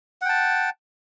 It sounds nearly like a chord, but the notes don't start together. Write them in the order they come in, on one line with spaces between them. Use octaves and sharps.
F#5 G5 A5